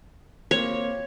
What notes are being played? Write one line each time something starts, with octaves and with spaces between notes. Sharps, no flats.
A#3 C4 C#5